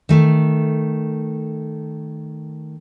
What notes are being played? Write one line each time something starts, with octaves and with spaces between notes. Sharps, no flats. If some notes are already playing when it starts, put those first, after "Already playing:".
D#3 A3